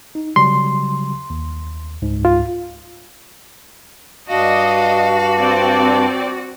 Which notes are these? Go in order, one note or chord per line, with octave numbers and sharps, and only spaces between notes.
D#4
C#3 F#3 G3 C6
D#2
C#2 G#2
F4
G2 D4 F#4 D#5 F5
C4 D5